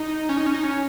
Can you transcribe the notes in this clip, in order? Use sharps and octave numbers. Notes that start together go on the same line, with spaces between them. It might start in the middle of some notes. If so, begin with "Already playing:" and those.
Already playing: D#4
C#4
D#4
C#4
D#4
C#4